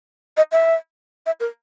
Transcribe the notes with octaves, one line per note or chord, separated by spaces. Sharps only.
D#5
E5
E5
A#4